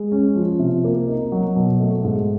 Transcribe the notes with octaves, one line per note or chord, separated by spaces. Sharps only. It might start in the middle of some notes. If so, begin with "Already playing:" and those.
Already playing: G#3
C#4
F3
C3
A#3
D#4
F#3
B2
A3
G#2